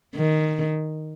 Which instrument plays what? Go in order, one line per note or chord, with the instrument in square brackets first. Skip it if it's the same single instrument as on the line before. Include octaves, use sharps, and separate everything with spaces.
[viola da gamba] D#3